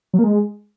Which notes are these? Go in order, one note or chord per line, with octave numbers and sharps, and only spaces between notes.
F#3
A#3
G#3